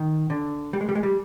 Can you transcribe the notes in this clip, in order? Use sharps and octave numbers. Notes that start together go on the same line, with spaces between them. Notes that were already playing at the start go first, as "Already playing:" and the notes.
Already playing: D#3
D3
G3
G#3
G3
G#3
G3